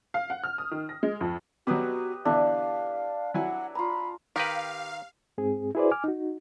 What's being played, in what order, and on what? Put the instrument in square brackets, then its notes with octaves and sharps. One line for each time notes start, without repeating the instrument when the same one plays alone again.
[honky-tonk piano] F5
F#5
F6
D#6
D#3
A#6
G#3
F2
[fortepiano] B2 F#3 [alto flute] F#4 [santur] G4 B4 D#5
[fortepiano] B2 D3 E3 [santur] D4 E5 [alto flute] F5
[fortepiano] F#3 E4 G#5 [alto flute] F#5
[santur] F4 A#5 [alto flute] B5
[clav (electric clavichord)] D#3 A#4 B4 [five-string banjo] G4 [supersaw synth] F5
[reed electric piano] G#2 C4 G#4
E4 F#4 G#4 B4 C5 D5
G#5 D6 F6
D#4 F#4